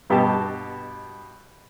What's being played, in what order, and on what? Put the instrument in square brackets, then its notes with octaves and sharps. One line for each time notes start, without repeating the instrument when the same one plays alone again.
[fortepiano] G2 B2 G4 D#5 A5